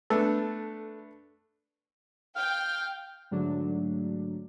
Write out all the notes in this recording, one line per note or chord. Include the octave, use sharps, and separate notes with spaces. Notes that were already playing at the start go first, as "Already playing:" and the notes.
A3 B3 D4 A4
F5 G5
G#2 D3 F#3 A3 D4